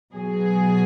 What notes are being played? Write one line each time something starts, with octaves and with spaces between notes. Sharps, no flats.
B2 F#3 G#4